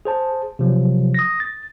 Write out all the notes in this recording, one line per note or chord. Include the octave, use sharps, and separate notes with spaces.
G#4 C5 A5
C3 F3 F#3
D#6 A#6
A6